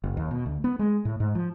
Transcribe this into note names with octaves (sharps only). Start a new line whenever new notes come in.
F#1
D#2
B2
D2
B3
G#3
A2
G#2
F3